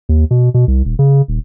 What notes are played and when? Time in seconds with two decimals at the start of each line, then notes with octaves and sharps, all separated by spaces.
0.09 D#2
0.31 B2
0.54 B2
0.68 C2
0.85 D#1
0.99 C#3
1.28 D#1